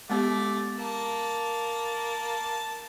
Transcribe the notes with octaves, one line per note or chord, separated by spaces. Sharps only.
G#3 A3 B3 G4 D5
A#3 A5